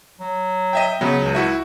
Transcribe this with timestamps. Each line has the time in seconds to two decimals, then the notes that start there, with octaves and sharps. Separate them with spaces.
0.20 F#3
0.73 D#5 E5 G5
1.01 C#3 F#3 B3
1.21 C#2
1.35 E4 F#4 E5